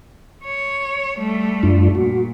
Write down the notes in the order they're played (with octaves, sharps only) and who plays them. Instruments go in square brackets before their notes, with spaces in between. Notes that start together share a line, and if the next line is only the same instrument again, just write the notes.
[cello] C#5
G3 A3
[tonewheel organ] F#2 D4 F4
[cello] A#2 [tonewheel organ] F#4